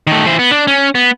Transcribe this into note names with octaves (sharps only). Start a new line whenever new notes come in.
D#3 A3
E3 C5
B3
D4
C#4
B3